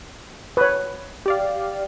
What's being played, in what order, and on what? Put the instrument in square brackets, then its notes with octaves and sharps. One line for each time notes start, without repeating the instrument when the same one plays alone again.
[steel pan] B4 C#5
[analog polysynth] G4 D5 F5